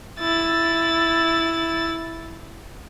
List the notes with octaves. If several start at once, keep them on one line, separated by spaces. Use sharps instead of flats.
E4 A6